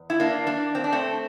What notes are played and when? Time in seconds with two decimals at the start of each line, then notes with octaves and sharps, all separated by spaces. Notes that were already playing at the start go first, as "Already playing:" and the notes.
Already playing: E2
0.10 E4
0.20 A#3 D4
0.47 A#3 D4
0.75 C4
0.84 D4
0.92 A3 C4